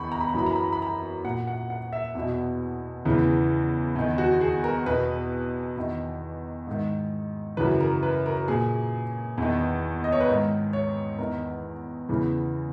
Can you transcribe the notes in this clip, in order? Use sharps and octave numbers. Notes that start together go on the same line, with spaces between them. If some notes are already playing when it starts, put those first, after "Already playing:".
Already playing: E2 D#3 B5 C#6
A#5
B5
A#5
F#2 E3 B5
A#5
B5
A#5
B5
A#5
A#2 F#5
F#5
F#5
E5
E2 B2
E2 C#3 E3
E2 D#3
F#4
G#4
A#4
E2 B2 B4
E2 D#3
G#2 D#3
F#2 C#3 E3 B4
A#4
B4
A#4
A#2 G#4
E2 D#3
D#5
C#5
B4
G#2 D#3 A#4
C#5
E2 D#3 A#4
E2 C#3 E3